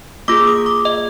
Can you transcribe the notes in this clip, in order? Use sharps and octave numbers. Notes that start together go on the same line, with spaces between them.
A#3 F4 G#4 D6
D#6
D6
D#5